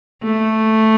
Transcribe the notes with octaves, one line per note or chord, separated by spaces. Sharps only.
A3